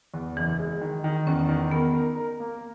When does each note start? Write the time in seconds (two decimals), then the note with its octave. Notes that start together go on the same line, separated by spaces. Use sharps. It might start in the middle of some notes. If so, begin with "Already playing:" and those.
0.14 E2
0.36 F#1 E3
0.59 G#3
0.81 D#3
1.04 D#3
1.27 E2 C#4
1.49 D#3
1.71 B3 A#4
1.94 A#4
2.16 A#4
2.40 A#3